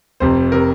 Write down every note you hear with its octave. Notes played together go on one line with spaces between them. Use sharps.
F1 F2 C3 C5
C3 A#4